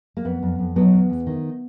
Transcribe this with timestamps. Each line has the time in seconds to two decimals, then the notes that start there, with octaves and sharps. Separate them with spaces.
0.17 A#3
0.25 F2 B3
0.43 F2
0.59 F2
0.76 F#3 B3
0.93 E2
1.10 E2
1.27 D#3